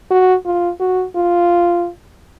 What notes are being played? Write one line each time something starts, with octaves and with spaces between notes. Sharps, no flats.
F#4
F4
F#4
F4